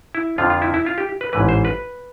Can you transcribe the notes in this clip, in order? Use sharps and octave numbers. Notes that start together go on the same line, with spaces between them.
E4
F2 D3 F3 F4
F4
E4
E4
F4
G4
B4
A1 G#2 E3 B4
C5
B4